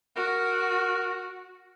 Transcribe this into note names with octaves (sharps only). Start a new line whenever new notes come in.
F#4 A#4